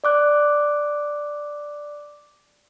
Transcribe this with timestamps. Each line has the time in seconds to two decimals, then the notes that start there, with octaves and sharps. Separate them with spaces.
0.04 D5 D6 F#6